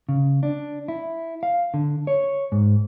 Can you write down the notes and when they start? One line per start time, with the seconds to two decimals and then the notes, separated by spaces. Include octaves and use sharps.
0.09 C#3
0.43 D4
0.88 E4
1.43 F5
1.74 D3
2.07 C#5
2.52 G#2